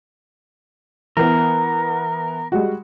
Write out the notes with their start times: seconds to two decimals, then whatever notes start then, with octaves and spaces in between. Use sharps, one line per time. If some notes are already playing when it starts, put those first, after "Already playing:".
1.17 E3 B3 A#4
2.52 G3 G#3 F#4